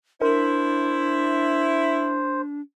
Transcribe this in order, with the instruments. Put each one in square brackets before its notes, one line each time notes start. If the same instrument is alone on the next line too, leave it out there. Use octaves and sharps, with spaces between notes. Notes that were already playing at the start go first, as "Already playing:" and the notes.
[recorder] D4 [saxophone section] E4 [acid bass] A#4 [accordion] C5